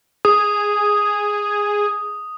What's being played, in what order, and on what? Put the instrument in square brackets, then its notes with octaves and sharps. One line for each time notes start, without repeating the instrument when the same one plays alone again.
[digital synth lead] G#4 [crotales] D#6